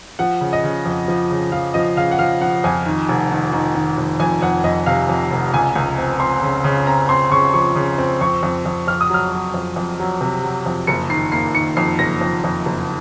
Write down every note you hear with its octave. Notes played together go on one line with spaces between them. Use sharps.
F3 F#5
C#3
D#5
C#3
F2
F3
C#3
F3 F5
F3 D#5
C#3 F5
F#5
F3 F5
F3 F#5
F2 G#5
D#3
F1
D#3
D#3
D#3
F1
F2 G#5
F2 F#5
F2 D#5
C3 F5
F2
F1
C#2 G#5
C#2
C4
C4 C6
C#3
C#3
C4 A#5
C4 C6
C#3 C#6
F3 C#6
C#3
C4
F2 C#6
F2
F2
F2 F6
D#6
F#3 F6
F#3
F2
F2
F#3
C3
F#3
F2
F#1 C#7
D#3 C7
A#3 C7
D#3 C#7
F2 C7
F#1 A#6
F2
F2
F#1